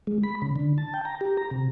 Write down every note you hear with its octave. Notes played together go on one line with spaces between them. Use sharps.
G#3
B5
C#3
D3
A5
G5
A#5
G4
A#5
C3